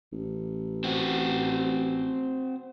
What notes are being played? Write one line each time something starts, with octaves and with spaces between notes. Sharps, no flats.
A1
C4 F#4